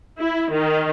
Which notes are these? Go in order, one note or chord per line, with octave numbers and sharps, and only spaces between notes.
E4
D#3